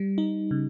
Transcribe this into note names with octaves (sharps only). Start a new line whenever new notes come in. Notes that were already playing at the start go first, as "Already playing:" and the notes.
Already playing: G3
D#4
C#3